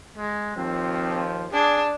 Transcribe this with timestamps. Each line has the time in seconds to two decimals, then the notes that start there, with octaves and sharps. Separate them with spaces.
0.17 G#3
0.56 D#2 F3 C4
1.53 D4 G#4